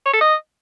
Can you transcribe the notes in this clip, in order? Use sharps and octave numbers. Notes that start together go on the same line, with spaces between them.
C#5
A4
D#5